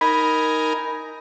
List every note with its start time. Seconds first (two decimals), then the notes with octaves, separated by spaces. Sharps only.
0.01 D#4 A#4 G#5 B5